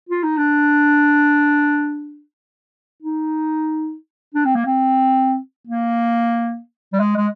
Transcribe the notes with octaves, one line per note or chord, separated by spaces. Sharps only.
F4
D#4
D4
D#4
D4
C4
A#3
C4
A#3
G3
G#3
G#3